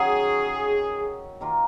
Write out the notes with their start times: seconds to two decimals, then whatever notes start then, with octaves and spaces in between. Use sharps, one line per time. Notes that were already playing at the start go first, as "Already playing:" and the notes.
Already playing: D#3 F#3 C#4 G#4
1.41 D#3 A#3 F4